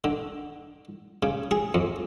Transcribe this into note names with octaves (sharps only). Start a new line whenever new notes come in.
D3
C#3
G#4
F2